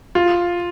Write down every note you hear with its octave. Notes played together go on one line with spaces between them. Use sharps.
F4